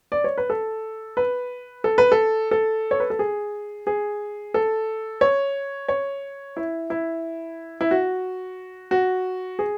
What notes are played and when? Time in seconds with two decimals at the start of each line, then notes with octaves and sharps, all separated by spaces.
0.12 D5
0.24 C#5
0.38 B4
0.50 A4
1.17 B4
1.84 A4
1.98 B4
2.12 A4
2.51 A4
2.91 C#5
3.00 B4
3.10 A4
3.19 G#4
3.87 G#4
4.54 A4
5.21 C#5
5.88 C#5
6.57 E4
6.90 E4
7.81 E4
7.91 F#4
8.91 F#4
9.59 G#4